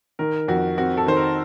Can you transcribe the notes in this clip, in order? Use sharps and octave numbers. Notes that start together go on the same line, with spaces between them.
D#3 A#4
F2 F#4
C4 F#4
A4
D#3 C5
A#4